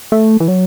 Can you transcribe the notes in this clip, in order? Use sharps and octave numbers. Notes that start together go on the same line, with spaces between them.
A3
E3
F#3